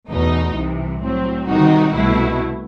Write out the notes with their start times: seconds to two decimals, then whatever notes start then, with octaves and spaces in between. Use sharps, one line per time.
0.09 E2 B2 A3 D#4
0.55 C2 C3 E3
1.01 A2 F#3 C4
1.47 C3 D#3 G3 D#4 F#4
1.92 C2 B2 A3 E4